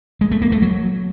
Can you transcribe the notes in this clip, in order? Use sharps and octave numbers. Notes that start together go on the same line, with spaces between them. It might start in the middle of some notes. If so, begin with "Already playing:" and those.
G#3
A3
A#3
A3
F#3